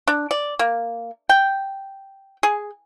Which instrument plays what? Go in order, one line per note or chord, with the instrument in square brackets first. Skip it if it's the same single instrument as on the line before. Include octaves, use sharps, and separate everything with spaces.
[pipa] D4
D5
A#3
G5
G#4